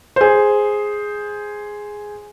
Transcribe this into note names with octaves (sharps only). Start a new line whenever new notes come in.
G#4 C5